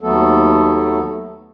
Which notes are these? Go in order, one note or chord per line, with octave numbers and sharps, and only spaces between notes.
D#2 F#3 A3 B3 A4